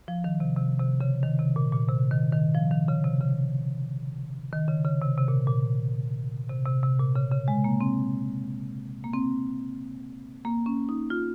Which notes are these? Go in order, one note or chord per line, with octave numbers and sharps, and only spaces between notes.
F3
D#3
C3
C3
C3
C#3
D#3
C3
A#2
A#2
C3
D#3
D#3
F3
D#3
C#3
C3
C#3
D#3
C#3
C#3
C3
C3
A#2
A#2
C3
C3
C3
A#2
C#3
C#3
G#3
A#3
C4
A#3
C4
A#3
C#4
D#4
F4